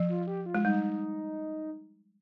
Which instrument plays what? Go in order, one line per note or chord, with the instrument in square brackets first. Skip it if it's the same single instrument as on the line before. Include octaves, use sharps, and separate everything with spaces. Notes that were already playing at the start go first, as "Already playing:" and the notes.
Already playing: [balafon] F3
[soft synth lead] F4
G4
F4
[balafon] G#3
[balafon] G3 [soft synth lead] D#4